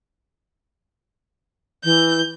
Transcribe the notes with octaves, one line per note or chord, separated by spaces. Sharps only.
E3 G6